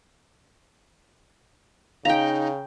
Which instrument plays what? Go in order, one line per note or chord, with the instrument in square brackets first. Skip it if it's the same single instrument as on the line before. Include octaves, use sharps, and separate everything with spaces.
[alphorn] C#3 [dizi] D#4 [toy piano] F5 [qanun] G5 A#5